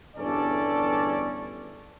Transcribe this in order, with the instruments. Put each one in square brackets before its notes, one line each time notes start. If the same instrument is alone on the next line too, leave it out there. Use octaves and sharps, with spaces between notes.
[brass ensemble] G1 E2 G2 C#4 A4 D5